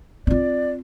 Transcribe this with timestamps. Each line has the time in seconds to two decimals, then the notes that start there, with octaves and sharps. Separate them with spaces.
0.27 C4 F4 D5